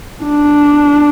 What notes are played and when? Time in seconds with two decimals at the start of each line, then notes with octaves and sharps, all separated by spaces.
0.24 D4